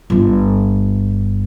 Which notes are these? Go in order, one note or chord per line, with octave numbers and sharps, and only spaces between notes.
G1 D4